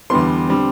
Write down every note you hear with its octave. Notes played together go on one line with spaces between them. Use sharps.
E2 D3 G3 B3 C6
D3 G3 C4